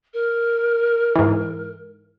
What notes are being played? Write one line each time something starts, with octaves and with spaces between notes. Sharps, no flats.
A#4
G#2 E3